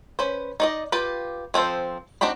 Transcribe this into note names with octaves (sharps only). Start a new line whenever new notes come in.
C#4 B4 C5
D#4 D5 D#5
F4 G4 B4
F3 C4 F4 A4 C5
C4 D4 D#4 F#4 B5